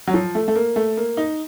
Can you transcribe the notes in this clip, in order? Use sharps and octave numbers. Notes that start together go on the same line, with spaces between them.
F#3
F3
A3
A3
A#3
A3
A#3
D#4